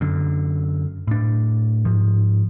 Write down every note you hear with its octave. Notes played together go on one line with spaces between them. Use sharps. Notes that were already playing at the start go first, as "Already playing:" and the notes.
F#2 D3
A2 D4
G#2 F3